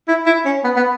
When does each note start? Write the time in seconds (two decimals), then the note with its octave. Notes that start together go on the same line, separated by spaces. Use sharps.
0.08 E4
0.26 E4
0.45 C#4
0.64 B3
0.76 B3